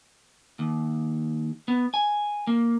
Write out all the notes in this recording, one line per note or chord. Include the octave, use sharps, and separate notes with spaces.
D#2
B3
G#5
A#3